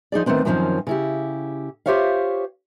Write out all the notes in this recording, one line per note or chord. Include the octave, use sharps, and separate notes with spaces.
F3 D#4 G#4 D5
D#3 A3 B3 C4 D4
F#2 D#3 F3 C4 C#4
C#3 E4 G4
F4 G4 C5 C#5 E5 F5